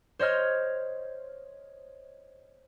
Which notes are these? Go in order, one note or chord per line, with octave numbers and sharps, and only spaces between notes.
C5 C#5 D#5 F6 G#6